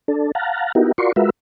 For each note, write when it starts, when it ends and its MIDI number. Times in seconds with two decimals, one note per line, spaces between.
0.08 0.31 62
0.08 0.31 69
0.35 0.72 77
0.35 0.72 78
0.35 0.72 81
0.35 0.72 82
0.75 0.92 59
0.75 0.92 63
0.75 0.92 64
0.75 0.92 66
0.75 0.92 67
0.75 0.92 70
0.98 1.12 65
0.98 1.12 66
0.98 1.12 70
0.98 1.12 74
0.98 1.12 84
0.98 1.12 85
1.16 1.30 56
1.16 1.30 65
1.16 1.30 66
1.16 1.30 70
1.16 1.30 71
1.16 1.30 76